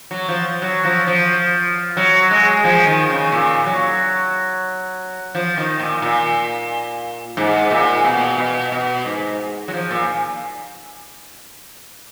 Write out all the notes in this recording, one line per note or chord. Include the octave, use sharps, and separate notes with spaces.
F#3
F3
F#3
F3
F3
F#3
G#3
F3
D#3
C#3
A#2
F#3
F3
D#3
A#2
A#2
G#2
A#2
B2
B2
B2
G#2
F#3
F3
A#2